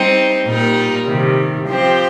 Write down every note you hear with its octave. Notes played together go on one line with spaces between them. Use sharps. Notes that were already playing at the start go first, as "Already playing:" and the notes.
Already playing: G3 C4 D#4
A#2 G3 D#4 A#4
C3 D#3 G3
F3 C4 G4